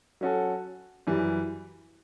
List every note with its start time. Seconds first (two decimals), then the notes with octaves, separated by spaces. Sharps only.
0.21 F#3 C#4 F#4 A4
1.07 F#2 E3 G3